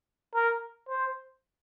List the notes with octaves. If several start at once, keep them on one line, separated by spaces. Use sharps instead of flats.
A#4
C5